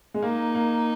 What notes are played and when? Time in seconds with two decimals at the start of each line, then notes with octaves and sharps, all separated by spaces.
0.14 G#3
0.22 A#3 D#4
0.55 A#3